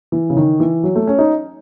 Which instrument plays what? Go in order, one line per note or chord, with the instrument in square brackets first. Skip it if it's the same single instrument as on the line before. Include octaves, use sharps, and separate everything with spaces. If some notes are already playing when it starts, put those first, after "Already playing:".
[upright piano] E3
C#3
D#3
E3
F#3
A3
C#4
D#4